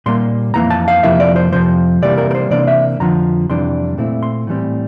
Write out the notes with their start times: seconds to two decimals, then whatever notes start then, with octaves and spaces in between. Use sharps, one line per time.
0.06 A#2 G3 A#3 C6
0.54 F2 E3 A#3 A#5
0.70 A5
0.88 F5
1.03 F2 C3 F3 A#3 E4 E5
1.20 D5
1.36 C5
1.52 F2 C3 F3 C5
2.02 C3 E3 G3 A#3 D5
2.18 A#4
2.31 A#4
2.35 C5
2.51 C3 E3 A#3 D4 D5
2.67 E5
3.00 F2 D3 F3 A#5
3.49 F2 C3 E3 G3 D4 C6
3.98 A#2 A3 C4 E4
4.23 C6
4.47 A2 E3 G3 C4